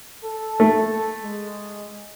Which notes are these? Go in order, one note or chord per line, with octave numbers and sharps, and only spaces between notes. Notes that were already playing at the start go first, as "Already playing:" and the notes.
A4
A3
G#3